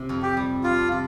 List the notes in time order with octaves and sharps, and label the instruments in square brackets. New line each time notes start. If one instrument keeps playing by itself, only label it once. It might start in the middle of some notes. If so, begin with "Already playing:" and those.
Already playing: [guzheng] C3
F2
[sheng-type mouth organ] G4
[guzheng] G3
[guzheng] D4 [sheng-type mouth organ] F4
[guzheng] C3